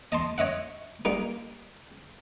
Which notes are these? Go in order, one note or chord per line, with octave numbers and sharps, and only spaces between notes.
D#5 A5 C6
C#5 D#5 E5 F#5
G3 A#3 D#4